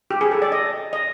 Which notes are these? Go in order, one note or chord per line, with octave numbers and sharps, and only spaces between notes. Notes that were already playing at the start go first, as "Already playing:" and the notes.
G4
G#4
A4
D5
D#5
D#5